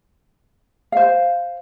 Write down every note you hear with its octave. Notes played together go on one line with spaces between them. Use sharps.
C5 F5